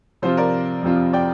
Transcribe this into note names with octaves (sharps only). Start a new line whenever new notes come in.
C3 F3 C4 F4 C5
A#4 D5
F2 C3 F3 C4 F4
D5 G5